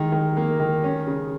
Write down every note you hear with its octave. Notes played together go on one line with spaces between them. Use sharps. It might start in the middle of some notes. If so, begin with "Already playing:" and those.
Already playing: D#3 G#3
D#3
A#3
D#3
C#4
C#3